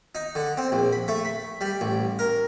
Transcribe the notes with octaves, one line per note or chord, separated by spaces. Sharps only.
D#4
D3
C4
A#1
B5
A3
B5
G3
A1
A#4